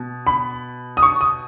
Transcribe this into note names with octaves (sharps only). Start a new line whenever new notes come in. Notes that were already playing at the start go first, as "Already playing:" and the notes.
Already playing: B2
B5
D#6
C#6
D#6